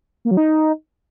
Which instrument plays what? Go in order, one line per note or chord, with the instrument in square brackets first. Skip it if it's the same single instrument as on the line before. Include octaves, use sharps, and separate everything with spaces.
[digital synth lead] A#3
F#3
D#4